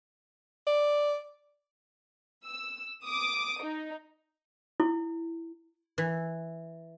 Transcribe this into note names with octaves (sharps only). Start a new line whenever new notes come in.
D5
E6
D6 D#6
D#4
E4
E3